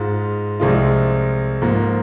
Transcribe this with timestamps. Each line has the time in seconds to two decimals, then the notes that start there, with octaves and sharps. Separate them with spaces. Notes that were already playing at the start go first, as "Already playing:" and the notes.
Already playing: G#2 G#3 F4
0.60 C2 C3 F3 G#3 F4
1.62 G#2 F3 A#3